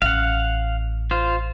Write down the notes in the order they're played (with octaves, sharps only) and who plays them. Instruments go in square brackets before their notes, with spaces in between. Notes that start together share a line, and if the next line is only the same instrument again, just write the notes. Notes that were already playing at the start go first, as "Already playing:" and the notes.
[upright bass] A1 [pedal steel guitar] F5 F#5
[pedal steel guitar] F4 C5